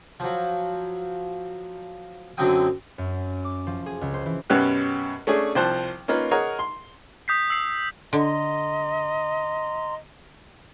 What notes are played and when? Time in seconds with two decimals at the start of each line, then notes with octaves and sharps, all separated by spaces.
0.20 F3 F#3
2.37 F#2 D3 F#3 C4 G5 D#6
2.98 F#2
3.44 D6
3.67 F3
3.86 G#4
4.01 C#2
4.14 C5
4.26 E3
4.50 F#2 B2 C#4 G4 B4 F#6
5.27 A3 C#4 D4 G#4
5.55 C2 F3 C5 A5 F#6
6.08 A#3 C#4 D#4 F4 A#4 B4
6.31 G#4 A#4 C#5 D#5 F#5 A#5
6.59 C6
7.28 D#6 G6 B6 C7
7.50 E6 C7
8.13 D3 D#5 A#5 C6